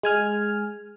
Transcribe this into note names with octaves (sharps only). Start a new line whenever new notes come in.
G#3 G#5 F6